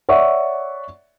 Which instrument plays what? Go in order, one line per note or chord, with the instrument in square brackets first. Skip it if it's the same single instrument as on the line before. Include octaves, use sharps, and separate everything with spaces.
[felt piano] C#5 D5 E5 F#5 C#6